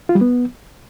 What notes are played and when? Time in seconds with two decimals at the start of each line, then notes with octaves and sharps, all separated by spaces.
0.09 F4
0.15 G3
0.21 B3